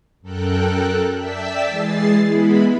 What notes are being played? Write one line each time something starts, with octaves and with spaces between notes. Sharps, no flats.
F#2 A4 A#4 G5 F#6
D5 E5 G5 A5 E6 B6
E3 G#3 G#4 A6 C7
G#3 B3 E4 B5